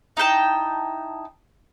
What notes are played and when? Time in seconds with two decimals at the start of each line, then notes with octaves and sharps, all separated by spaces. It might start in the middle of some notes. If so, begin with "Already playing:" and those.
0.17 D#4 E4 G5 A5